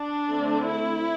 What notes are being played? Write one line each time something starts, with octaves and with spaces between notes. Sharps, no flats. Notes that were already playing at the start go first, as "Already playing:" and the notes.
Already playing: D4
D3 A3 C4
E4